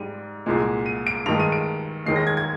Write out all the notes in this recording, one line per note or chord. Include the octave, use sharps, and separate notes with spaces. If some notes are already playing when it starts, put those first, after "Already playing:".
Already playing: G#2 G3 D#7
C2 A#2 G#3
D#7
D7
G2 D#3 G#3 F7
D#7
D7
D#2 D#3 G#3 C7
A#6
G#6
G#6